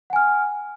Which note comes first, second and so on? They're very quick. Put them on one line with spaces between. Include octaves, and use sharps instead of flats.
F#5 G#5 F6